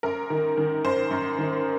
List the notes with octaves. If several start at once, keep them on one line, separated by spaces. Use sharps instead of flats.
F#2 A#4
D#3
D#3
F#2 C5
F#2
D#3